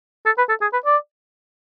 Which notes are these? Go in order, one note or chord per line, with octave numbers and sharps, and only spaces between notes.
A4
B4
A4
G#4
B4
D5